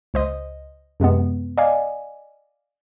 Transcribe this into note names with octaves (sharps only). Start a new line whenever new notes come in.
C#2 C5 D#5
F#2 C3 G#3 B3
D5 D#5 F5 G#5